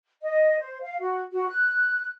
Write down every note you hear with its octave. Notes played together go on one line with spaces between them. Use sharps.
D#5
C5
F5
F#4
F#4
F#6